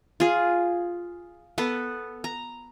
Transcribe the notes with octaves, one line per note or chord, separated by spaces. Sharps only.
F4 G#4
B3 A4 B4
A#5